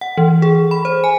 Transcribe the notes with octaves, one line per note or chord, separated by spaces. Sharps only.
F#5
E3
G#4
B5
C5
G#5